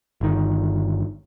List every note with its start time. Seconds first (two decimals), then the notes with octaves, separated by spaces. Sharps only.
0.21 G1 D#3